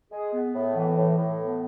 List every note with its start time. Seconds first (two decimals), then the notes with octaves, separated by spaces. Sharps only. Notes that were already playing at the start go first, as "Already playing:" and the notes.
0.11 G#3 G#4
0.33 B3
0.54 A2
0.75 E3
0.96 A2
1.17 A2
1.39 B3